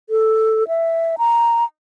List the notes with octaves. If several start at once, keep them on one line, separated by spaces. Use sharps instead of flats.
A4
E5
A#5